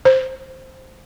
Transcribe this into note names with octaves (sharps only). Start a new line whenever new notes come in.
C5